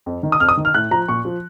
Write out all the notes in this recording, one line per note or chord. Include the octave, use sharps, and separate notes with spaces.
F2
D#3
D#6
F2 F6
D#6
D#3
F6
A2 F#6
F3 A#5
A#2 C#6
F3